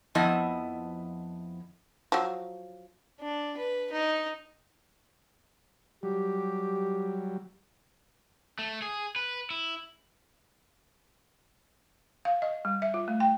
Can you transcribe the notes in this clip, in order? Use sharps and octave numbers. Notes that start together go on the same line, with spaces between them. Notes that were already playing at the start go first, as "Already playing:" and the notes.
F2 F3 B3 E4 D#5
F3 F#3
D4
B4
D#4
F#3 G3 G4
A3
G#4
B4
E4
F5
D#5
G3
E5
F4
A3
G5